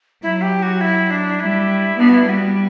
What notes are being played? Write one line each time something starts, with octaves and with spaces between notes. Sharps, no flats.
F#3 E4
G4
F#4
E4
D4
G3 E4
B3 D4
F#4
E4
G3 F#4